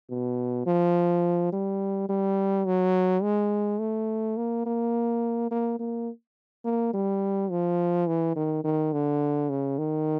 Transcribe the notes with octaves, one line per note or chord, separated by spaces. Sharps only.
B2
F3
G3
G3
F#3
G#3
A3
A#3
A#3
A#3
A#3
A#3
G3
F3
E3
D#3
D#3
D3
C#3
D#3